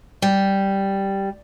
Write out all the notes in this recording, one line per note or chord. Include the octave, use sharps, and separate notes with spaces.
G3